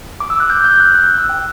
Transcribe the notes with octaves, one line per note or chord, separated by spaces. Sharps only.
D6
E6
F#6
G6
G6
F#6
F#6
F#6
E6
G5